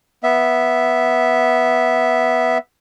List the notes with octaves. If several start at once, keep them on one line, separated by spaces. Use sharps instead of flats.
B3 E5